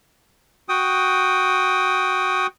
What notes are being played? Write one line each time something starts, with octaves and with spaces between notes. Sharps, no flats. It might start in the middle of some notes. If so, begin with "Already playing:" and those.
F#4 G5 D#6